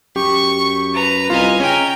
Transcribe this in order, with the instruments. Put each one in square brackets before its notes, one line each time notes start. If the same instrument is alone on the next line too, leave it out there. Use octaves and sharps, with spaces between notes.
[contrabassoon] F#2 [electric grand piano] G4 [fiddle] C#6
[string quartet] B4 A#5
[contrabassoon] C2 [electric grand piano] F4 [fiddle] D#5 G#5
[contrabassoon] C#3 [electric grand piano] C#4 [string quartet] G5 A#5